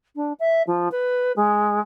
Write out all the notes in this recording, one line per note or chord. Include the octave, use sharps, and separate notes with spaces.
D4
E5
F3
B4
G#3